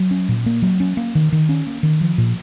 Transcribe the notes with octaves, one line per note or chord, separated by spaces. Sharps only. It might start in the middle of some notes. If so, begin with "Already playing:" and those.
Already playing: F#3
C#4
A#2
A#3
F#3
C#4
A#3
D#3
D#3
C#4
A#3
D#3
F3
A#2